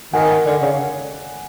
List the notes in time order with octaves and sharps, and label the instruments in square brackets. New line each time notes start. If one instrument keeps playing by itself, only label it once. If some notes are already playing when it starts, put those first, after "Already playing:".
[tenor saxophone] D#3 [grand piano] F#5 G#5
[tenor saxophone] D3
C#3